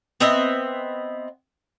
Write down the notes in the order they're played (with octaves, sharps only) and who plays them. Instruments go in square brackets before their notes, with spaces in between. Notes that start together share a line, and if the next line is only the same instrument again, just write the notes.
[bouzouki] B3 C4 D#5 E5